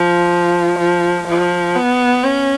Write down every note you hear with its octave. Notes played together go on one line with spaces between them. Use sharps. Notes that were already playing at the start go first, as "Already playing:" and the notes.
Already playing: F3
F3
F3
B3
C#4